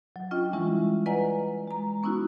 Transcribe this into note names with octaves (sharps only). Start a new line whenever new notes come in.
F#3
C#4 D4 F4 D#5 G5
E3 G3 G#3 C#4 E4
B4 D5 D#5 F#5 G#5 A#5
G#3 A#5
B3 C#4 D#4 E4 F#4